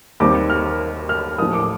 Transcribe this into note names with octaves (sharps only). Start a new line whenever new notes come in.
D#2 D#3 G3 C4 D6
F6
F6
A#1 A2 F3 D#6
D6